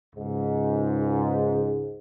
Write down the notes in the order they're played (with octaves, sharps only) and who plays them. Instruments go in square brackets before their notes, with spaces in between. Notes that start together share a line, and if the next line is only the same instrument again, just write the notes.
[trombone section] C#2 G#2